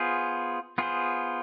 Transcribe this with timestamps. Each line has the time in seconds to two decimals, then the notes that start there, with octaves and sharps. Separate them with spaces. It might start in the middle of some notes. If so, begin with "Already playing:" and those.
Already playing: B3 F4 G#4 C5
0.78 B3 F4 G#4 C5